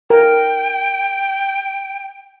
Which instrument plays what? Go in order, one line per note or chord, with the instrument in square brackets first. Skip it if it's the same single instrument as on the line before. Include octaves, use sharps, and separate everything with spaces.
[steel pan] A#4 [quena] G5